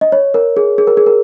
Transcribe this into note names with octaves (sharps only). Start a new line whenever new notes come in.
D#5
C#5
A#4
G#4
G#4
A#4
G#4
A#4